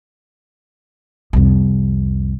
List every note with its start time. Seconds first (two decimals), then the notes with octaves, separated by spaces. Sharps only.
1.33 C2 F2